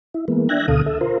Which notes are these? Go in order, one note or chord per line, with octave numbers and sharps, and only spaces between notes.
E4
E3 G#3 A#3 B3
D4 E5 G5 F#6 G#6 A#6
D2 B2 D3 A4 F5 D#6
A4 E5
F4 A#4 C5